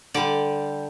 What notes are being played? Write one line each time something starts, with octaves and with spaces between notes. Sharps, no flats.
D3 G3 D5